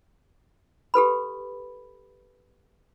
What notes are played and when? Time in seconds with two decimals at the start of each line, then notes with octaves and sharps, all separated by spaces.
0.94 G4 A4 B4 B5